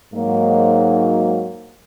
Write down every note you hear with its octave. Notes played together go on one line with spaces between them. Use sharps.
G#2 F#3 A#3